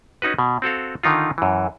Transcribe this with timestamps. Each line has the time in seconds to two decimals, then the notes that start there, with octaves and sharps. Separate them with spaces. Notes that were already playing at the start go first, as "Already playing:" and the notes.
0.22 C#4 D#4 F#4 B4
0.39 B2
0.62 C4 F#4 A4 F5
1.03 D3 D#3 D#4 F4
1.38 F#2 E3